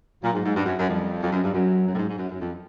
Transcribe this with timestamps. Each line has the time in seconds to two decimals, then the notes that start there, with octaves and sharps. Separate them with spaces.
0.22 A#2 F#3
0.33 G#2
0.44 G#2
0.55 G2
0.65 F#2
0.77 F#2
0.88 F2 G3
1.21 F2 F#3
1.31 F#2
1.42 G2
1.53 F#2 F#3
1.85 F#2
1.93 A2
1.97 G#2
2.08 G#2
2.18 F#2
2.29 F#2
2.40 F2